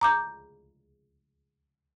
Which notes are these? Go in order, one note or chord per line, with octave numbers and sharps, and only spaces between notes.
A#5 D6 G6